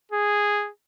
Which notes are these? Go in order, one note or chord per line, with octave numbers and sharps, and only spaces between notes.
G#4